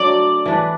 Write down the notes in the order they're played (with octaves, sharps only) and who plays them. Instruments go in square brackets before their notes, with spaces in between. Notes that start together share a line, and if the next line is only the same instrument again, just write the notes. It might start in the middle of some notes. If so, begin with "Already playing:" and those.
Already playing: [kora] D3 F#3 A3 D4 [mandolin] D5
[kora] E3 D4 B4